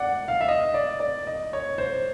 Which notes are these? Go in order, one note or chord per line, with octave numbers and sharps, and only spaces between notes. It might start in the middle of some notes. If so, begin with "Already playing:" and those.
Already playing: D5 F#5
F5
E5
D#5
D5
D5
D#5
C#5
C5